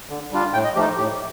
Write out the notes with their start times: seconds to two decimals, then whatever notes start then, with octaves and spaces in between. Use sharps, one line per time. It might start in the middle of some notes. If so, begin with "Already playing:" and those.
0.09 D3
0.31 G3 D4 F4
0.53 A2 G5
0.64 D#5
0.75 F3 A3 D#4 G4
0.97 A2 G4